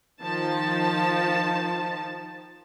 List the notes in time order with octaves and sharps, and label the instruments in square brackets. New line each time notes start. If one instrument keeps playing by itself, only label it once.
[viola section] D#3 F3 A5